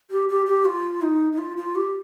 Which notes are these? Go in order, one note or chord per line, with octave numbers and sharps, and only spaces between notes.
G4
G4
G4
F4
D#4
D#4
F4
F4
G4